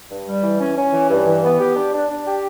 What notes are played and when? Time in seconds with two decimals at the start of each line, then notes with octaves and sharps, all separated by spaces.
0.09 G2
0.27 G3
0.43 E3
0.59 C#4
0.76 C#4
0.92 E3
1.10 G2
1.25 E3
1.43 B3
1.59 G4
1.76 D4
1.93 D4
2.09 D4
2.26 G4